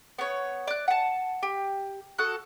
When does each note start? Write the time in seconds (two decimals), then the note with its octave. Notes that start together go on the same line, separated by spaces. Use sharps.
0.19 B3 C#5
0.67 D5 F#6
0.88 F#5 A5
1.43 G4
2.18 F#4 A4 D#6 F#6